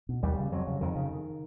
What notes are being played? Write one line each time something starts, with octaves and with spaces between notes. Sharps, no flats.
B2
D#2 G3
C#3
F2 F#3
C#3
F2 D#3
C#3